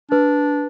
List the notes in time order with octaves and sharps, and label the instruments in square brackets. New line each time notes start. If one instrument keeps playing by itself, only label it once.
[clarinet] D4 [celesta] B4